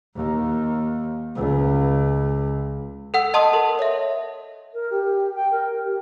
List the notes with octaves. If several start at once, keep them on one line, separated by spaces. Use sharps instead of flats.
D#2
C#2
A4 F#5 E6
D#5 A5 C6 D#6
A4 A#4 A5
C#5 E5
A#4
G4
G5
A#4
G4